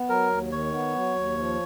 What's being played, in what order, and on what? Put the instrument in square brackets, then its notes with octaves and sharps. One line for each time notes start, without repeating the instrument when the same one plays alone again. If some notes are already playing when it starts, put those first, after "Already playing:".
Already playing: [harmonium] B3
[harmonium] F#3 [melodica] A#4
[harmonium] D#2
[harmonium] D#3 [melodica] C#5
[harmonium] B3
F#3
D#2
F3